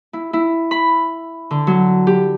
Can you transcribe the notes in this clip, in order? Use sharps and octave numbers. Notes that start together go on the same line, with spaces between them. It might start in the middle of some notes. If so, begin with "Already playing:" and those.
E4
E4
B5
D3
F#3
G4